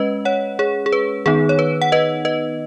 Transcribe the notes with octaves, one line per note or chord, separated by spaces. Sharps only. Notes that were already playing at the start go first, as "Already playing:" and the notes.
Already playing: G#3 C#4 B4 D#5
C#5 F#5
G#4 C#5
G#4
B4
D#3 B3 D#4 G#4
C#5
B4
F#5
B4 D#5
B4 D#5